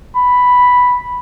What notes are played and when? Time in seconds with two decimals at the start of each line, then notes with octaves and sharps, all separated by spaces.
0.17 B5